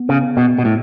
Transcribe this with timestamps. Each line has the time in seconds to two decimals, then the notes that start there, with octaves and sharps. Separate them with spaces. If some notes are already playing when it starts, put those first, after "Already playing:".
Already playing: B3
0.09 C#3
0.37 B2
0.58 B2
0.65 A2